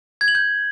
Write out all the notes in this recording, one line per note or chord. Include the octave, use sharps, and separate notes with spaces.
G#6
F#7
G6